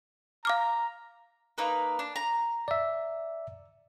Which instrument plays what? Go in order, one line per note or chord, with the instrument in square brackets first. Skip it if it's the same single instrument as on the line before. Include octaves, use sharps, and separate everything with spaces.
[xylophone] F5 D6 F6 [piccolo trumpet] A#5
[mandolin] A#3 D#4 B4
D4
A#5
[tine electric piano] D5 E5